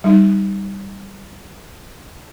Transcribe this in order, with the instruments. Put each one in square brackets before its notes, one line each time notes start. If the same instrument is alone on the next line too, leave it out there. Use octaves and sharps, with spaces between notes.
[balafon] G3 D#4